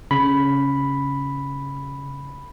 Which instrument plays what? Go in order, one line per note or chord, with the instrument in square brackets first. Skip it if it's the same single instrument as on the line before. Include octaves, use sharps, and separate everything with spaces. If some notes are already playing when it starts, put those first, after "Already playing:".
[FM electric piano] C#3 [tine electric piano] B5